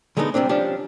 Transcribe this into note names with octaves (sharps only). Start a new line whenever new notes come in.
D3 G#3 A3 B3 D#4
C3 F3 G3 C4 D4
F3 C#4 D4 G4